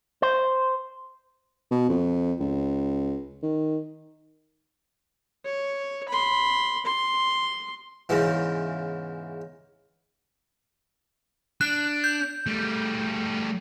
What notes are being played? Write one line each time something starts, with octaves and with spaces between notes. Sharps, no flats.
C5
B2
F2
C#2
D#3
C#5
B5 C6
C6
E2 G#2 C#3 E3
D4 F#6
G6
G3 A3